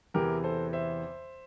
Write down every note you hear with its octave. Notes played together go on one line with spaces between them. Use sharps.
E2 C3 E3 G4 A#4
A4 C5
C5 E5